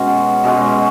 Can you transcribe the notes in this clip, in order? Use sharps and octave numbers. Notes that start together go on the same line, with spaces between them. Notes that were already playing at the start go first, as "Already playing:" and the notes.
Already playing: B2 G#3 C#4 F#4
B2 G#3 C#4 F#4